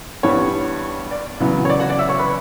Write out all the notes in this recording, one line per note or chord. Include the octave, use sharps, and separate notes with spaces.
G2 E3 G3 B3 C#5
D5
E2 C#3 F#3 B3 E4
C#5
D5
F#4 F#5
D5 D6
E5 E6
C#5 C#6
B4 B5